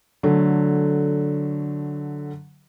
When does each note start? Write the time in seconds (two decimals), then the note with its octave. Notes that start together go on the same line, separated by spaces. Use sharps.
0.23 D3 F#3 A3